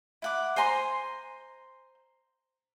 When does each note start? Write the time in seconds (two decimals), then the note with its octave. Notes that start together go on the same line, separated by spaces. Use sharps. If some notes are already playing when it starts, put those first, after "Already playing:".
0.22 E4 F#5 D6
0.56 C5 G#5 A#5 C6